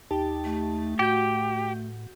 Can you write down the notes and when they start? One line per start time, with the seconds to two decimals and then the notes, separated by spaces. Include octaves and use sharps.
0.11 D#2 D#4 G4 A5
0.45 A3
0.99 A2 F#4 G4 G6